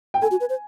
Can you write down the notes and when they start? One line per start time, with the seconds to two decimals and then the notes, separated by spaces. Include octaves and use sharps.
0.14 G5
0.22 A4 G#5
0.31 F#4
0.40 B4
0.49 C5